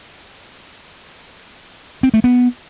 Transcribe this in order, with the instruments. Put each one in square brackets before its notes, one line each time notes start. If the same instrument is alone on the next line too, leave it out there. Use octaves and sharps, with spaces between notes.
[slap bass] C4
A3
B3